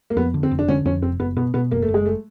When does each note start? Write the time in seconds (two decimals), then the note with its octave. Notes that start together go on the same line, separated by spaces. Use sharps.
0.10 A#3
0.17 F2 B3
0.34 D3
0.43 C4
0.51 F1
0.59 D4
0.68 D3 C#4
0.85 F2 C#4
1.02 F1 C4
1.20 F#1 B3
1.36 B2 B3
1.54 B2 B3
1.71 F#1 A#3
1.82 A3
1.88 F#1
1.94 G#3
2.06 A3